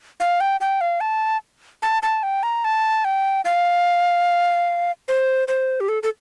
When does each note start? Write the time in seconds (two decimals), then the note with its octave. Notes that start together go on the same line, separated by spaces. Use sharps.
0.20 F5
0.41 G5
0.61 G5
0.81 F5
1.01 A5
1.82 A5
2.03 A5
2.23 G5
2.43 A#5
2.64 A5
3.05 G5
3.45 F5
5.08 C5
5.48 C5
5.80 G4
5.89 A4
6.03 A4